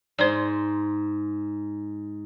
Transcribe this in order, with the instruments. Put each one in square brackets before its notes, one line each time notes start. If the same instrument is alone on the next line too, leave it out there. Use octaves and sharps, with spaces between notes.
[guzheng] G#2 C6 [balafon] C5 D5